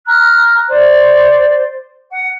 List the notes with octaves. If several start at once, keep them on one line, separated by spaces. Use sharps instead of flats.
A#5 F6 F#6
C5 D5
F#5